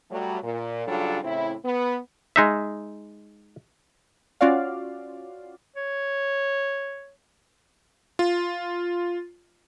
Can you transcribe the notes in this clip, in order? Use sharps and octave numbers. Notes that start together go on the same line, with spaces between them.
F#3 G3 A3
A#2
C#3 F#3 G3 D4 F4 A4
A2 C#3 C4 E4
B3
G#3 D#4 E5
C#4 F4 F#4 D5 F5
C#5
F4